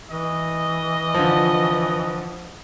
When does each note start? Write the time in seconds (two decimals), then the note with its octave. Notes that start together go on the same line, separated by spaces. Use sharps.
0.11 E3 D#5
1.14 D3 F3